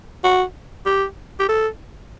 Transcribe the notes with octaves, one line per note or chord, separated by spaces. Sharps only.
F#4
G4
G4
A4